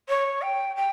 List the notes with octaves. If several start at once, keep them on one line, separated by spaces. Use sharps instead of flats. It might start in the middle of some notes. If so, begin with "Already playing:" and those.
C#5
G5
G5